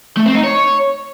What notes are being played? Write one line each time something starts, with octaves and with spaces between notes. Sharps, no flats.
A3
C4
D#4
C#5